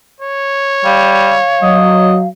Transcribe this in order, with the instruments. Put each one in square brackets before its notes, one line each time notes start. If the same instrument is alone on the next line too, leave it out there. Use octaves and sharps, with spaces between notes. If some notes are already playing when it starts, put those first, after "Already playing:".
[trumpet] C#5
[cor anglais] G3 [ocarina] F5
[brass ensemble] F#3 [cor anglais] D#5